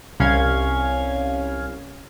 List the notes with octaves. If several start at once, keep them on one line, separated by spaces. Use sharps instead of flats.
C2 C#4 F5 G#6